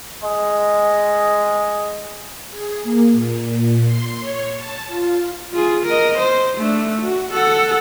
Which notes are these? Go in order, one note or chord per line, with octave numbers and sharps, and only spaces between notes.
G#3 D#5
G#4
A#3
A#2
A#2
C6
C#5
A5
F4
F4 G#4
A#4 D#5
C5
A3 D4
F#4
A4 F#5